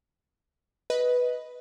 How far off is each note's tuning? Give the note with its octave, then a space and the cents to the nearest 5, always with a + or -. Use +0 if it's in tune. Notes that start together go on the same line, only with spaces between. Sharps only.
B4 +0 D#5 +10